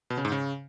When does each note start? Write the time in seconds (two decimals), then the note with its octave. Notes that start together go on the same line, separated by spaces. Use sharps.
0.10 B2
0.17 C#3
0.25 G#2
0.32 C#3